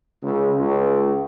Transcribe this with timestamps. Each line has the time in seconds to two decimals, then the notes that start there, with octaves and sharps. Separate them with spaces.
0.22 C#2
0.59 C#2